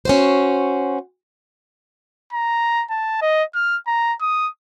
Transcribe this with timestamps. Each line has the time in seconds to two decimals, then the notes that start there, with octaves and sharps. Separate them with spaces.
0.05 C#4 F#4 C5
2.33 A#5
2.90 A5
3.22 D#5
3.55 F6
3.87 A#5
4.21 D#6